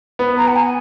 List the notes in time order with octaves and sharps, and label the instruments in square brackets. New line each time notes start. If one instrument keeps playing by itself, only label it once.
[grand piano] B3
[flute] A#5
F#5
G#5